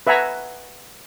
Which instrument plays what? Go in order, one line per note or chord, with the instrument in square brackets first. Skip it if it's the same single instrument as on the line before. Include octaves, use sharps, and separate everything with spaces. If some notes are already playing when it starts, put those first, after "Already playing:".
[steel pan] B4 E5 F#5 G#5 A#5